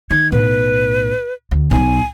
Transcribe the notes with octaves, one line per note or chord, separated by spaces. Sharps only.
D#3 G#6
B1 A2 B4
D2
B1 F#3 G#5